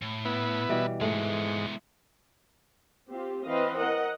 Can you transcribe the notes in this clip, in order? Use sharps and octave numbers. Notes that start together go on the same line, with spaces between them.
A2
B3 E4
B2 E3 G3
G#2 G#3 A3 B3
C4 F4 G4
E3 C4 B4 D#5 F5
A#4 D#5 F#5